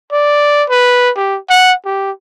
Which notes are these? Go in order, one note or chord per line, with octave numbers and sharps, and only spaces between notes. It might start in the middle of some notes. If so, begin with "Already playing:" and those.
D5
B4
G4
F#5
G4